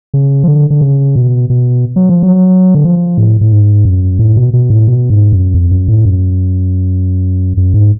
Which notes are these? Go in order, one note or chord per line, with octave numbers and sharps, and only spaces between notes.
C#3
F3
D3
D3
C#3
B2
B2
F#3
F3
F#3
D3
F3
A2
A2
G#2
F#2
A2
B2
B2
A2
B2
G#2
F#2
F2
F#2
A2
F#2
F#2
G#2